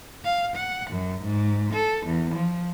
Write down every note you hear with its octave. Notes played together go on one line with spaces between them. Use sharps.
F5
F#5
F#2
G#2
A4
E2
F3